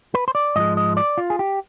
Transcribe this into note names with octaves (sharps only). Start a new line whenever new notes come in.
B4
C5
D5
G#2 F3 G#3 D#5
D#5
D5
F4
G#4
G4